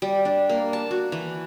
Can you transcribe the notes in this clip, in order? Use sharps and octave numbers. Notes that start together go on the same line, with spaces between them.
G3
D4
A#3
A5
F#4
E3